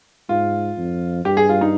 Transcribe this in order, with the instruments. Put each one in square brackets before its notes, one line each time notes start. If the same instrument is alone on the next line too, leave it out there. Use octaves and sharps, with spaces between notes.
[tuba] G#2 [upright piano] F4
[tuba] F2
[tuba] G2 [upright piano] G4
[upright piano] G#4
F4
D#4